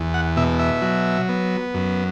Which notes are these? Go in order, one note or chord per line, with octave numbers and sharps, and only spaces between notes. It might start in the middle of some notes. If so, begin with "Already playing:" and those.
Already playing: E2
F#5
B2 E5
E5
F#3
B3
F#2